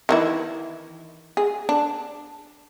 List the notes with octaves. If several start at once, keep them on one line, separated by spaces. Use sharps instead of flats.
D#3 E3 E4
G#4
D4